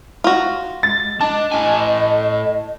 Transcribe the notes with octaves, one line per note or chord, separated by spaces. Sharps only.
F4 F#4
G#3 A6
D4 D#5 A5
A2 G#5